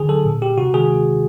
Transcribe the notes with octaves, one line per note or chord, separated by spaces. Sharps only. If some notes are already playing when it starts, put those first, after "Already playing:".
Already playing: D3 G#4
F#3 A4
A#2
G3 G4
C3 F#4
D#3 G#3 G#4